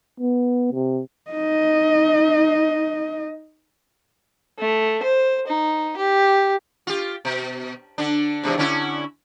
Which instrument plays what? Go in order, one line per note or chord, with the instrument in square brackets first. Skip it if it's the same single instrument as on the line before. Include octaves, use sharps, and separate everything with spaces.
[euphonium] B3
C3
[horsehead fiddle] D#4 D#5
[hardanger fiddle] A3
C5
D#4
G4
[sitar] F4 G4
B2
D3 D4
E2 G#2 C3
D3 C#4 E4